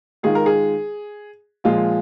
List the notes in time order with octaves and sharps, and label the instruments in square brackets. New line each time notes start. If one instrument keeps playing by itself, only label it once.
[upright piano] D#3 G#3 F4 G#4
A#4
G#4
A#2 F3 G#3 F4